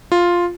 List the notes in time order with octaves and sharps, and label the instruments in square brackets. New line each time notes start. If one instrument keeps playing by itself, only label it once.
[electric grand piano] F4